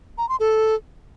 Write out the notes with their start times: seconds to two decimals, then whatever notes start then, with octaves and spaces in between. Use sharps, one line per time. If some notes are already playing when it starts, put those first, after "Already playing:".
0.18 A#5
0.29 C6
0.40 A4